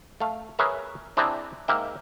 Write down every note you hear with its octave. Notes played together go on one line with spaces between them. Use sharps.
A3 F5
G#4 A#4 B4 C#5 E5 A#5
C4 D4 E4 G#4 C5 A#5
G#2 A#3 A#4 E5 G5